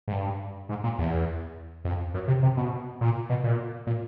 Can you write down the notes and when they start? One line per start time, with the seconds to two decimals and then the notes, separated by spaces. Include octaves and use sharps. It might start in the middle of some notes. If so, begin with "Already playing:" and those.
0.08 G#2
0.12 G2
0.69 G#2
0.84 A#2
0.98 E2
1.85 F2
2.14 F#2
2.28 C3
2.43 C3
2.57 B2
3.01 A#2
3.30 B2
3.44 A#2
3.87 A#2